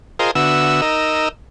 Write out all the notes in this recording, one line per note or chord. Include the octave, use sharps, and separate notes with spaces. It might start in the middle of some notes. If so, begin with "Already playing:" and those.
F4 G#4 A#4 C5 D#5
D3 B3 F#4 E5 E6
D#4 A#4 D#5 E6